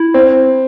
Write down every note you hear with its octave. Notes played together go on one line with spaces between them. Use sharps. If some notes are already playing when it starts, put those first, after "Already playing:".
Already playing: E4
C4